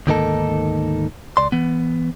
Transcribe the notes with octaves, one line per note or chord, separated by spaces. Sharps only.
D2 G#2 D#3 A#3 D#4 A4
C#2 D5 C6
E3 B3